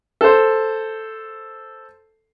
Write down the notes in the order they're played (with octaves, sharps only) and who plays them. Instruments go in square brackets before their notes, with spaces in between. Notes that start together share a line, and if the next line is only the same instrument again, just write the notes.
[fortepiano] A4 C5